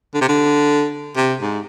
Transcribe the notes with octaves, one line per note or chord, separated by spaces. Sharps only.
D3
C3
D3
C3
G#2